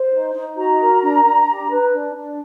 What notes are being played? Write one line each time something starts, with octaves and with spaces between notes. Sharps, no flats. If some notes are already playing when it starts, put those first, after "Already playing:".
Already playing: C5
D#4
D#4
F#4 A#5
A#4
D4
D4
G4
B4
D4
D4